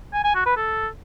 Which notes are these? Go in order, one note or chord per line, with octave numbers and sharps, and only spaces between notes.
G#5
G#5
F#4
B4
A4